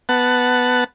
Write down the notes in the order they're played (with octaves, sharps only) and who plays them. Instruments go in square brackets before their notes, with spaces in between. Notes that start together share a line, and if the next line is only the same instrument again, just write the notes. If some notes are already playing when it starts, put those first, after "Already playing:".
[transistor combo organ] B3 F#5 A5